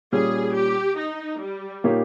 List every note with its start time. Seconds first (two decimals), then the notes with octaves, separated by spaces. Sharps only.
0.13 A#2 G3 C#4 G#4
0.55 G4
0.98 D#4
1.42 G3
1.84 A#2 A#3 D#4 G4 C#5